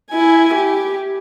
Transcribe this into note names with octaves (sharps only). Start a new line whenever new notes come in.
E4 G#5
G4